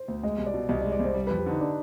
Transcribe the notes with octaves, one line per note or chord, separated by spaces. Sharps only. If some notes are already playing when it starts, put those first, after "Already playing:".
Already playing: C5
D2
G#3 D#5
C2
D5
B2
C2 D#5
D5
G#3
D5
C2 C5
G3
B4
F2
G4
D3 D#4
D4